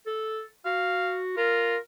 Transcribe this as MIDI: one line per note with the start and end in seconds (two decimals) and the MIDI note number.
0.07 0.44 69
0.65 1.34 66
0.65 1.19 77
1.37 1.76 65
1.37 1.78 70